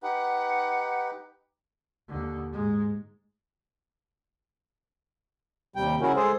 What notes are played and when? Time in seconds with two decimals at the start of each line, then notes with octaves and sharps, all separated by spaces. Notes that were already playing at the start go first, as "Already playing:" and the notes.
0.03 D#4 G4 B4 F#5
2.08 D#2 D3
2.53 G#2 G#3
5.76 D#2 C3 G3 G5
6.01 C#3 F#3 C#4 E4 F#4 A#4
6.16 G#3 G#4 A4 C5